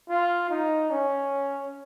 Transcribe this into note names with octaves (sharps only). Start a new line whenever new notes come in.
F4
D#4
C#4